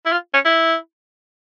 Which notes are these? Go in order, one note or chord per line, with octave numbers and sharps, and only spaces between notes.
E4
F4
C#4
E4